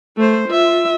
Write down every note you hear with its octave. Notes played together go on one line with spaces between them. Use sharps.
A3 C5
F4 E5